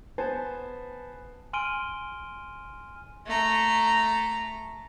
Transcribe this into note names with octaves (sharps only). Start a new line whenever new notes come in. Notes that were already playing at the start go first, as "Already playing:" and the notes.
B3 C5 G#5 A5
G#5 C6 F6 D7 D#7 G7
A3 A#5